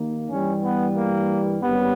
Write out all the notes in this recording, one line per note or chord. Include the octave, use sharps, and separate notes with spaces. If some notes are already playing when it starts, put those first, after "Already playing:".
Already playing: D#2 D#3 A#3
G2 E3 G3 C#4
B3
A#3
G#1 G2 G3 B3 C#4 G4